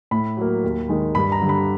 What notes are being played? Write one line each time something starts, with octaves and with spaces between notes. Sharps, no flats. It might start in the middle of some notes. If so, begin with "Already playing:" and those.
A2 B5
F#3 A#3
D#2
D#3 G#3
G2 B5
A#5
D3 G3
B5